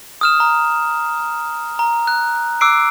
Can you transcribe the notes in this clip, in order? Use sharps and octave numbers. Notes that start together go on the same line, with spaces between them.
D#6 F6 E7
A#5
A#5
F#6
D6 E6 F#6 C7 D7